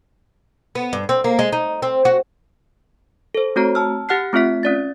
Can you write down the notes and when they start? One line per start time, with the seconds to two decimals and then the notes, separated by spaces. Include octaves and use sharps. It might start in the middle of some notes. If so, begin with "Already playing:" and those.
0.75 B3
0.93 G2
1.09 C4
1.24 A#3
1.39 G#3
1.53 D#4
1.82 C4
2.05 F#4
3.35 A4 C5
3.56 A3 C4 F#4 C#5 A#5
3.75 A5 E6 F6
4.09 G4 F#5 F6 F#6 C7
4.33 A3 C4 F4 E5 B6
4.63 C#4 D5 A6